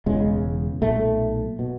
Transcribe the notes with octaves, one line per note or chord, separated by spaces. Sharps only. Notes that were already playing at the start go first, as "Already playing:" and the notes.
E1 E2 C#3 G#3
B1 A#2 A3
B2